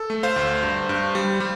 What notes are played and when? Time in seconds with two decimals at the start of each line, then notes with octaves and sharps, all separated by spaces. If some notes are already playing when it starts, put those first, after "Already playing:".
Already playing: A4
0.10 A3
0.23 C5 F5
0.36 D2
0.63 G2
0.89 G2
1.15 G3
1.40 G3